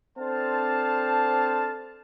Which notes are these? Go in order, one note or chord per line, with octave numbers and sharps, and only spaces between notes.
C4 D4 A4 C5 F5 A5